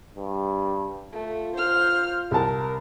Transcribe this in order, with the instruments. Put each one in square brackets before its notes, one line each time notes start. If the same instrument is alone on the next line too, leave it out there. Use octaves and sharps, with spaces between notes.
[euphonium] G2
[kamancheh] A3 [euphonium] F4
[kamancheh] C5 F6
[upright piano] C2 A5 [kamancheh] A#4